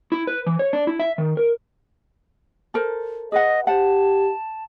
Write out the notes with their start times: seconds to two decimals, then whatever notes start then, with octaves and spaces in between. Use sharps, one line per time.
0.12 E4
0.27 B4
0.47 E3
0.59 C#5
0.73 D4
0.87 E4
1.00 E5
1.18 D#3
1.37 A#4
2.74 A4 A#4 C5
3.32 G#4 B4 D#5 F#5
3.67 G4 C5 F#5 A5